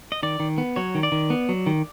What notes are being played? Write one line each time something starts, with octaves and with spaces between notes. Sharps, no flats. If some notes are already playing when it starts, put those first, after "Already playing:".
D#5
D#3 D5
D#3
B3
F#3 C#5
D#3
D5
D#3
B3
F#3
D#3